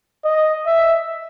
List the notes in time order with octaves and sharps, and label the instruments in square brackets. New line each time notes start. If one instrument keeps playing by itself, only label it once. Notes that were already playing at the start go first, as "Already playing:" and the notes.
[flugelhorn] D#5
E5